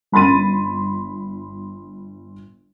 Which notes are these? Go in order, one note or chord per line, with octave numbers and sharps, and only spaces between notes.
G1 B5 C6 A6 D#7